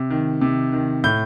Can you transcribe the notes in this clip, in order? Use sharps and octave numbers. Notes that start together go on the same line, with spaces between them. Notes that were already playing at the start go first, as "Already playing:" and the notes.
Already playing: C3
D#3
C3
D#3
A2 G6